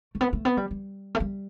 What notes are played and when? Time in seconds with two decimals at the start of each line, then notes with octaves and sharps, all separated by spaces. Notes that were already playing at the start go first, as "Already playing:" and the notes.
0.15 A3
0.21 B3
0.33 A3
0.45 B3
0.57 G3
0.71 G3
1.15 A3
1.20 G3